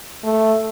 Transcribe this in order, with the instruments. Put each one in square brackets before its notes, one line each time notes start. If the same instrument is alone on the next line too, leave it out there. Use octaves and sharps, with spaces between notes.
[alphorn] A3